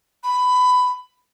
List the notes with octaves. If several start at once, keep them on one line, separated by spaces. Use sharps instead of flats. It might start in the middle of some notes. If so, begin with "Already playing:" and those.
B5